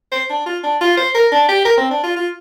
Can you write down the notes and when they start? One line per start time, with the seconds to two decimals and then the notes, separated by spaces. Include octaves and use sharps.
0.12 C5
0.30 D4
0.46 F4
0.64 D4
0.81 F4
0.97 C5
1.14 A#4
1.32 D4
1.49 G4
1.65 A#4
1.78 C4
1.91 D4
2.03 F4
2.16 F4